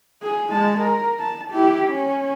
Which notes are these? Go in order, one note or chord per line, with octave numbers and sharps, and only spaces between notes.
G#4
G#3 A5
A#4
A5
E4 G4
C#4